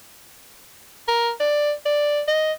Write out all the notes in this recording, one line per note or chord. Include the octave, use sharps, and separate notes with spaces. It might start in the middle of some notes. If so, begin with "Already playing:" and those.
A#4
D5
D5
D#5